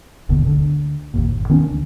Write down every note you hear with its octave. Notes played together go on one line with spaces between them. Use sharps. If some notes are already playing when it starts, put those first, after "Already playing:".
G1 D#2 B2 D3
D2 D3
G1 D#2 A#2
D#3 B3 C#4 D4
D2